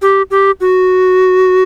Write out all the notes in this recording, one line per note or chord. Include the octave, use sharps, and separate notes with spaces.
G4
G4
F#4